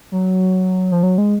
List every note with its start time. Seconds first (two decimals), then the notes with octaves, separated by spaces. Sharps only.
0.12 F#3
0.92 F3
1.03 F#3
1.18 G#3